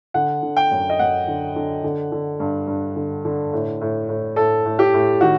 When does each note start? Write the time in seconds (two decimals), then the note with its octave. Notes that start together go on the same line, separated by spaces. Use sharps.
0.14 D3 F#5
0.42 D3
0.57 G5
0.71 F#2
0.90 D#5
0.99 F#2 F#5
1.28 D3
1.56 D3
1.84 D3
2.12 D3
2.40 G2
2.67 G2
2.96 D3
3.25 D3
3.53 A2
3.81 A2
4.09 A2
4.36 A2 A4
4.65 A2
4.79 G4
4.94 A2
5.21 D#3 F#4